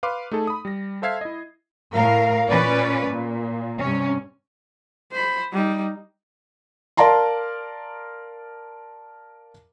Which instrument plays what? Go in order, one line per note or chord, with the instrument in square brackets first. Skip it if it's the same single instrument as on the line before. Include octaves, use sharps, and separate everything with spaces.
[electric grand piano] B4 F5 C6 D6
A3 D#4 G#4 A4
B5 D#6
G3 A#6
A4 C5 E5 F5 G#6 C7
E4 D#5
[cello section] A2 A#4 F5
A#2 C#4 B4 D5
A#2
G2 C3 C#4
[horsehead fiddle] C5 B5
G3 D#4
[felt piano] A#4 D5 F5 A5 A#5 C6